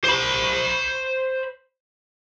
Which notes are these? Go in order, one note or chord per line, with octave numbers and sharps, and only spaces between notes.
C5 B5